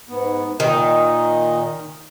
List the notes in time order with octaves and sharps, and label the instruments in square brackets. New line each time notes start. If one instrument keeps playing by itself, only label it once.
[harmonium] G#2 B3
[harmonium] A#2 D#5 [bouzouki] D#3